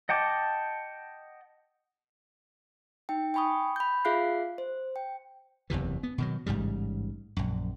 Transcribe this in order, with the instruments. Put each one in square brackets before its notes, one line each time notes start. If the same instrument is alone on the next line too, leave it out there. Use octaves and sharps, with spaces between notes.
[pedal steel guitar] D#5 F#5 G5 A5 D6
[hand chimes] D#4 G5
G5 G#5 B5 C#6 D#6
B5 G6
F4 G#4 E5 F5 F#6 C7
C5
G5
[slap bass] F#1 E2 C3 E3
B3
B2 D#3 F#3
A1 G#2 C#3 G3
A#1 F#2